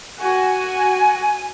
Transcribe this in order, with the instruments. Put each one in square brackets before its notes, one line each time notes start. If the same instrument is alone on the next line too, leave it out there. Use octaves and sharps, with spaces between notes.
[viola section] F#4 [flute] G#5